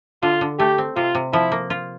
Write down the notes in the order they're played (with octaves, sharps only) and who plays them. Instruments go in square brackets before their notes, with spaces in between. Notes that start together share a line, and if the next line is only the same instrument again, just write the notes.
[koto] D3 [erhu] F4
[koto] D3
[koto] A3 [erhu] G4
[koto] C4
[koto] C3 [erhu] F4
[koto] C3
[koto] F3 [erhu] E4
[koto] A#3
F4